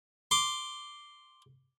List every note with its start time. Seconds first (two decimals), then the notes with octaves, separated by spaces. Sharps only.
0.31 C6 D6